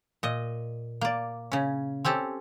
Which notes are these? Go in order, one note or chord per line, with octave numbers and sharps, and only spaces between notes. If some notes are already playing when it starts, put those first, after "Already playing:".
A#2 D#5
A#3 D5
C#3 C#4
C4 C#4 G4 A4